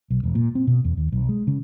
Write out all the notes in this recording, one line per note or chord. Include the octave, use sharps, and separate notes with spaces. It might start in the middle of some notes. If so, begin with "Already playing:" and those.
B1
E1
A#2
C4
B2
E2
D#2
B1
G#3
C#3